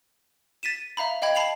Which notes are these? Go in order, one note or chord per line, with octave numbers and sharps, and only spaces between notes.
A6 B6 D#7 E7
E5 F5 A#5 B5
D#5 F5 G5 B5 G#6
A5 B5 C7 F7 F#7